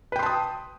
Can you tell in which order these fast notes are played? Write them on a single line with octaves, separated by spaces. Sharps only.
B4 G5 C6 A5 D#6